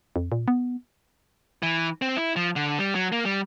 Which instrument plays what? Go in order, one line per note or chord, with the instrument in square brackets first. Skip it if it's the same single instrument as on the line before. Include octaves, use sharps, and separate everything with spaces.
[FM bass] F2
A#2
B3
[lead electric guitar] E3
C4
E4
F3
D3
G3
F#3
A#3
G3